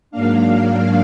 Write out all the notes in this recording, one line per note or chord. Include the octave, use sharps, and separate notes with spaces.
G#2 F#3 A#3 D4 F5